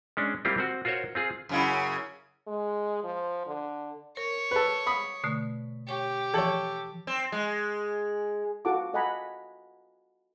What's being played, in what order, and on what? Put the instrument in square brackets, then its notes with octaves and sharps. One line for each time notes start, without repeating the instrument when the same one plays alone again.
[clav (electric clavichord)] G#3 C#4 D4
G3 A#3 C4 E4 F4 G4
C4 F#4
F4 F#4 A#4 C5 C#5
C4 F4 G#4
[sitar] F#2 C#3 E4
[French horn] G#3
F3
D3
[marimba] A#4 [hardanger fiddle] C#5
[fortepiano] A4 B4
B5 D#6
[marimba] B2 D3 A3
[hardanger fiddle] G4 [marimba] C#5 C#6
[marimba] E3 F3 [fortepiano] A4 C#5
[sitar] C4
G#3
[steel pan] F4 F#4 A4 F#5 A5 D6
A4 D#5 F#5 G#5 A#5 B5